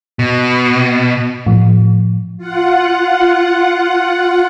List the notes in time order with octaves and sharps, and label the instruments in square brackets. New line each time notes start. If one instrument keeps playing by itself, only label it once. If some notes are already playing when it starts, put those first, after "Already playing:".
[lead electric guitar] B2
[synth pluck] A2 F3
[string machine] F4 F#5